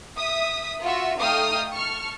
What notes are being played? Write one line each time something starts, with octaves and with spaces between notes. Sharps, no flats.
E5 D#6 B6
F4 F#4 E5
A3 D#4 F5 G5 D#6 F6
A5 C#6 F6